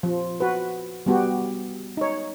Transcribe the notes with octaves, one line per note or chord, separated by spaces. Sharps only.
F3
F#4 B4
G3 B3 F#4 G4
D#4 C#5